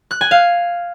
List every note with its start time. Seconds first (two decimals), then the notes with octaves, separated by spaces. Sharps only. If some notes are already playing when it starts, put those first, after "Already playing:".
0.11 F#6
0.21 G#5
0.31 F5